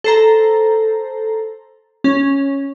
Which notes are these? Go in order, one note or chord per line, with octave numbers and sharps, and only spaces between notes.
A4 C5 A#5
C#4